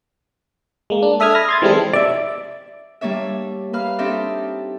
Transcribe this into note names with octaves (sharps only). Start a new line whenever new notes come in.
G#3 A#3
D4
A4 E5 D#6 F6 G#6
B5 D#6 F6 A#6
C6 G#6 A6
E3 G3 G#3 C4 E4 A4
D5 E5
G3 A#3 D4 C#5 E5
A#3 B4 F5 F6
C4 D4 D#4 G4 A4 E5